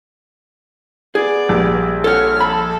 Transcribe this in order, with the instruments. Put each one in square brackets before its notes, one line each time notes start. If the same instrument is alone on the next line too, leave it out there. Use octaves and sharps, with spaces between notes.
[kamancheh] B3 D5 [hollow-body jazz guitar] G#4
[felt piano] A#1 G3
[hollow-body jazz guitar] A4 F#5 [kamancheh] C#5 F6
[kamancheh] A4 [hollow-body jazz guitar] B5